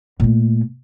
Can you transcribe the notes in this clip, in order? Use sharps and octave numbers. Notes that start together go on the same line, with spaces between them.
A#2 A3